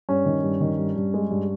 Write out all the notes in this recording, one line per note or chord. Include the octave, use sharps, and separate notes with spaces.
G2 C#4
D#3
G2
D#3
G2
G2
G#3
G2